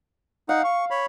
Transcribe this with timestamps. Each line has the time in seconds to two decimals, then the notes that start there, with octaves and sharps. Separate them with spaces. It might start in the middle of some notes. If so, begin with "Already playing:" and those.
0.49 D#4 F5 F#5
0.64 C#6
0.91 C#5 B5